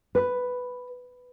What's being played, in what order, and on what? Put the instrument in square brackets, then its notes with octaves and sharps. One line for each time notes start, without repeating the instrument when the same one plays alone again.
[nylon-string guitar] B4